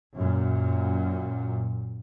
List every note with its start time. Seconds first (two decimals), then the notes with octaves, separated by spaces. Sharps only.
0.14 F#2 A#2